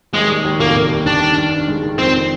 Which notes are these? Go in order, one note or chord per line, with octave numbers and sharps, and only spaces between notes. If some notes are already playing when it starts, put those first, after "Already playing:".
D#2 G#3
G3
D#2
F1 A#3
F1
G3
D#3 D4
G2
G2
G2
G#3
D#3
F2 C4